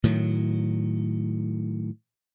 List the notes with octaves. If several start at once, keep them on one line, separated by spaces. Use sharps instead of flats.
A2 D#3 F#3